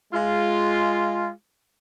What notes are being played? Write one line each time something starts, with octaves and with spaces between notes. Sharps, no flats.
G#3 F4